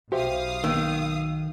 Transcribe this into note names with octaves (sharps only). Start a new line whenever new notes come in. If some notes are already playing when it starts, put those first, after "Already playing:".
B1 F#4 G4 C5 E5 F5 D#6
D#3 A#3 B3 E6